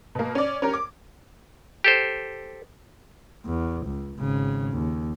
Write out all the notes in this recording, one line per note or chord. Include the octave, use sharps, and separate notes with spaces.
B2 A#3
C#4 D5
C#4 G4 A#4
D6
G4 A4 C5
E2
C#2
G#1 C#3
D#2